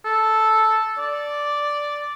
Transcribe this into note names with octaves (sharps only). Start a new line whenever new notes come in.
A4
D5